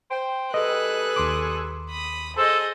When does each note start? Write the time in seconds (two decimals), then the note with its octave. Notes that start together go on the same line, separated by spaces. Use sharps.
0.10 C5 G5
0.54 G3 G#4 A4 B4 D#5 F#6
1.16 D#2 C6 D6
1.90 B5 D#6
2.37 G#4 A4 C5 D#5